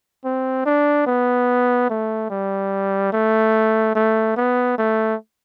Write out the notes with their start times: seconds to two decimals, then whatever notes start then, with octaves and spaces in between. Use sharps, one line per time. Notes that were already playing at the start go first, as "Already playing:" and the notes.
0.25 C4
0.66 D4
1.07 B3
1.90 A3
2.30 G3
3.13 A3
3.95 A3
4.37 B3
4.78 A3